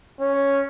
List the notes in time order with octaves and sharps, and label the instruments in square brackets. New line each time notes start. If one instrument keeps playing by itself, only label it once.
[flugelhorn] C#4